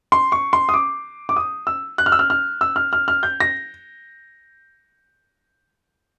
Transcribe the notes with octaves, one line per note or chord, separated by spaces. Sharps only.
C6
C#6
C6
D#6
D6
D6
D#6
E6
F#6
F6
E6
F6
F6
E6
F6
F6
F6
G6
A#6